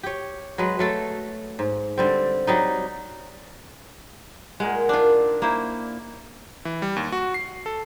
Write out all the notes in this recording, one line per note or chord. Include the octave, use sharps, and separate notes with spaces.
G4 C#5
F#3 G#3 B4
F#3 A3 A4
G#2
D3 G3 C4
F#3 G3 D#4
A#2 G#3 A#4 F#5
A#2 D#3 D4 F4
A#3 E4 C5
E3
G3
D#2
F#4
C7
A4